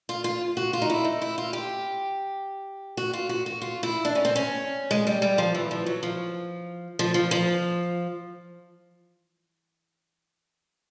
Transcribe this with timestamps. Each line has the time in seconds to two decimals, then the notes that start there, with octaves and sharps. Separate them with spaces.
0.09 F4
0.24 F4
0.57 F#4
0.73 F4
0.82 D#4
0.90 E4
1.05 D#4
1.22 E4
1.38 F4
1.53 G4
2.97 F#4
3.13 F4
3.29 F#4
3.46 F#4
3.61 F4
3.83 E4
4.05 D4
4.15 C#4
4.25 C4
4.36 C#4
4.91 G#3
5.07 G3
5.22 G3
5.38 F3
5.55 E3
5.71 F3
5.86 F#3
6.03 F3
6.99 F3
7.14 F3
7.31 F3